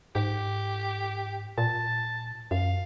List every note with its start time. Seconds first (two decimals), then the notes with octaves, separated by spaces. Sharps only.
0.15 G#2 G4
1.58 A#2 A5
2.51 F#2 F5